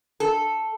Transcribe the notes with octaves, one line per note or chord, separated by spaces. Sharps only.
A4